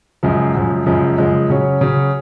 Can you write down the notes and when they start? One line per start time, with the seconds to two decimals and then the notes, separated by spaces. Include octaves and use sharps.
0.23 F#2 C#3 F3 G#3
0.54 F#2 C#3 F3 G#3
0.86 F#2 C#3 F3 G#3
1.18 F#2 C#3 F3 G#3
1.50 C#3 F#3 C#4
1.81 C#3 F#3 C#4